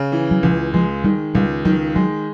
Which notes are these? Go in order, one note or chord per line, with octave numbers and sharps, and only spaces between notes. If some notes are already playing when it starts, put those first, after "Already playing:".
Already playing: C#3
E3
F#3
C#2 F3
F3 G#3
D#3 G3
C#2 G3
D#3 F#3
F#3 G#3